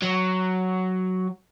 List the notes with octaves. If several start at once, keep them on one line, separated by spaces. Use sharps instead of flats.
F#3